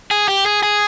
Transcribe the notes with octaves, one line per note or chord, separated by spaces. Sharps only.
G#4
G4
G#4
G#4